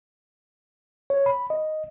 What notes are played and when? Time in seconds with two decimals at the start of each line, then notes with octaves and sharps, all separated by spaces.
1.10 C#5
1.26 B5
1.50 D#5